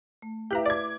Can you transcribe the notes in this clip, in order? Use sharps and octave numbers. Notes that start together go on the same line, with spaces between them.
A3
E4 G4 B4 E5 F5 A#5 F#6 G6
D5 D6 G#6